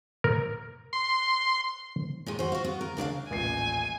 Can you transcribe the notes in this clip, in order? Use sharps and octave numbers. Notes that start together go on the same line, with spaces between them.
A#4
C6
A#2 D#3 G#3
F#4 C5
F#4 F5
B3
A#4
C#3 D4 D5 F5
D#1 A1 G#5 C7